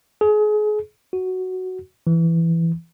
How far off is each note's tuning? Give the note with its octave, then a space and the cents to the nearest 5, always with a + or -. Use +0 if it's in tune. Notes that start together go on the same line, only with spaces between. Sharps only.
G#4 +30
F#4 +5
E3 +10